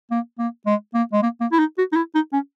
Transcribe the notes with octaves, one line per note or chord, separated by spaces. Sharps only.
A#3
A#3
G#3
A#3
G#3
A#3
A#3
E4
D#4
F#4
D#4
E4
D#4
C#4